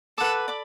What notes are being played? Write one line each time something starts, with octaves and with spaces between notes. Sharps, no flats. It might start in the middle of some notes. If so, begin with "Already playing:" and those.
A4 B4 F#5 D6
D5 B5 D6